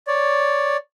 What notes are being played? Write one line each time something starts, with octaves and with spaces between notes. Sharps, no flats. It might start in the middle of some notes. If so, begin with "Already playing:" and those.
C#5 D5